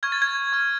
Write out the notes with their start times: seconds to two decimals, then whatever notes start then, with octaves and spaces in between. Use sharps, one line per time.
0.03 C#6 F6 G#6
0.12 A6
0.22 G#6
0.53 C#6 F6